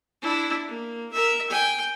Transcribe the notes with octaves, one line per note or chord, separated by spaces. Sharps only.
D4 E4
A#3
A#4 E5
G5 G#5